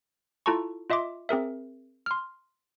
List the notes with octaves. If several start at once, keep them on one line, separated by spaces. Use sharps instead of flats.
E4 F4 A4 A5 A#5 C#6
F4 D#5 E5 C6 D6
C4 G#4 A#4 E5
C6 F6